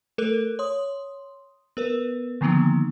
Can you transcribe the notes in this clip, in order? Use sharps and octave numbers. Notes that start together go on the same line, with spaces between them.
A3 A4 A#4 F#6
C#5 C6 D#6
B3 A#4 B4
D3 D#3 F3 A#3 B3 D#4